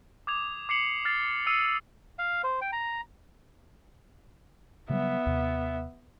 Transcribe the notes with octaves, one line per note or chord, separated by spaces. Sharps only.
D6 D#6 G#6 F7
D6 C7 C#7 F#7
F6 A6 C7
D#6 E6 C7 C#7 D#7
F5
C5
G5
A#5
C#3 F#3 G3 B3 E5
D#2 C3